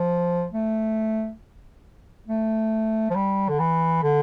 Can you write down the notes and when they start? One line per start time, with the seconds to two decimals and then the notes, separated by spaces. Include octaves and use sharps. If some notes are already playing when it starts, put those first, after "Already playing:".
Already playing: F3
0.53 A3
2.28 A3
3.10 F3
3.15 G3
3.49 D3
3.59 E3
4.03 D3